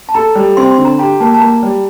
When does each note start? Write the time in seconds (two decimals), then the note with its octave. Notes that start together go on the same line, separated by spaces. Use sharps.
0.09 A5
0.14 A4 A#5
0.35 G3
0.57 C4 C6
0.71 C6
0.78 D3
0.85 A#5
0.99 G4 A#5
1.20 A#3 A5
1.34 A5
1.41 A#3 A#5
1.63 G3